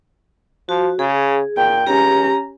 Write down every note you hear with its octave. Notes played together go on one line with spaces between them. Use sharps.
F3 F#4
C#3 G#4
A#2 G5
C#2 C#4 G4 A#5